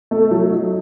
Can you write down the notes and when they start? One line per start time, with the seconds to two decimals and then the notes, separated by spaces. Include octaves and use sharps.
0.11 A3
0.31 F#3
0.51 D#4